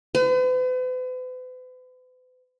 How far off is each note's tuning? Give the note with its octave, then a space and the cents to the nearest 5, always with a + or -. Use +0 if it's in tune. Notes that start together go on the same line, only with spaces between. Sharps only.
B4 +45